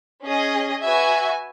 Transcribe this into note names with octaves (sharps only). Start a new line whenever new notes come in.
C#4 G#4 D#5
F#4 B4 E5 G#5